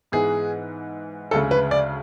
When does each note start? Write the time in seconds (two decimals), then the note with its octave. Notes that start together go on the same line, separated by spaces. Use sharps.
0.12 G#2 E3 B3 E4 G#4
1.31 D2 C#3 G#3 A4
1.51 B4
1.71 D5